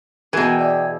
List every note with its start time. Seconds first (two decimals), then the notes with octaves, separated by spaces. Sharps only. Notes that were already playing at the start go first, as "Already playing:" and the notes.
0.33 B2 E3 B3 F#4 G#4 A#4 G5
0.59 D5 E5